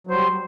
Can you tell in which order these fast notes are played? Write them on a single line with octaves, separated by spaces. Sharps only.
F#3 C5 G3